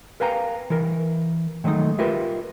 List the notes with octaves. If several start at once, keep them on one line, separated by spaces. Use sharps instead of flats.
A#4 B4 F5 G5 G#5 A#5
E3 A#4
D#3 F#3 G#3 A3 D#4
F4 G4 A#4 B4 E5